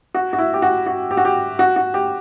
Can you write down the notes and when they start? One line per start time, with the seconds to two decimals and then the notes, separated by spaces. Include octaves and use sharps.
0.14 F#4
0.33 F#4
0.39 E4
0.54 G4
0.62 F#4
0.86 F#4
1.11 G4
1.17 F#4
1.25 G4
1.59 F#4
1.76 F#4
1.94 G4